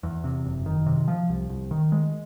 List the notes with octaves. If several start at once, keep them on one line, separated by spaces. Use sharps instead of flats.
E2
C3
F#1
D#3
C3
F3
C2
C2
D#3
G#3